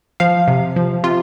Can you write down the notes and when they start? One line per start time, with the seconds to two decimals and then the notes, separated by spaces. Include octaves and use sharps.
0.20 F3 F5
0.48 C3
0.76 F3
1.04 C3 F4